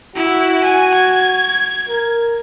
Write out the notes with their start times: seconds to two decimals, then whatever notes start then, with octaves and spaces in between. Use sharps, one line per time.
0.16 E4 F#4
0.64 G#5
0.94 G#6
1.89 A#4